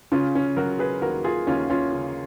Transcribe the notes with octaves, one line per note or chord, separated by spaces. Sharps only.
C#3 C#4 F4
C#4
F#3 F#4 A#4
G#4 B4
D#2 F#4 A#4
F4 G#4
D#2 C#4 F4
C#4 F4
C#3